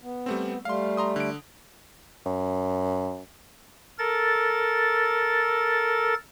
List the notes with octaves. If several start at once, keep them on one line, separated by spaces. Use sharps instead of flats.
B3
G3 A3 C4
G3 A3 F5 C6
A#5 C6 D#6
D3 D7
F#2
A4 A#4 A6